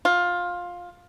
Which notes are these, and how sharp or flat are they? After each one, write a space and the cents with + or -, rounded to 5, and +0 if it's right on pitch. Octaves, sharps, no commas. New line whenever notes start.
F4 +15